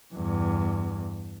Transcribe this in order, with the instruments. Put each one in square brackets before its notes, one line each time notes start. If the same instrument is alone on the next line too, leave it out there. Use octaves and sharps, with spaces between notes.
[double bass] E2 G2